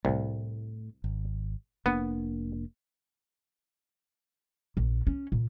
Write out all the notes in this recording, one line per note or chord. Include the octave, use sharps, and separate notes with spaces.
C2 A2 A3
G#1
F1 A#3 B3 D4
A#1
C#4
A#2